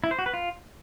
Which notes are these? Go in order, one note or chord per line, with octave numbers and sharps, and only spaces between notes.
E4
C5
F#4
B4
F4